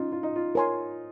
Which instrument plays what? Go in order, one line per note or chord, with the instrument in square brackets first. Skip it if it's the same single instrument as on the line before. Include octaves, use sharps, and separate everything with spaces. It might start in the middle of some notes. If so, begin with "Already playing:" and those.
Already playing: [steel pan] C#4 [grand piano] D#4 F4
[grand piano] F4
D#4
F4
[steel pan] A#4 C#5 G#5 C6